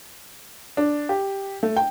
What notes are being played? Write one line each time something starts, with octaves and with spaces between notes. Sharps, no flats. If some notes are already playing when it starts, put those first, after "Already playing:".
D4
G4
A3
G5